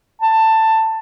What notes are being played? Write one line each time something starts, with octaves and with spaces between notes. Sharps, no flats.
A5